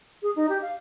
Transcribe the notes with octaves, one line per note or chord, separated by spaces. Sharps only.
G#4
D#4
G4
F5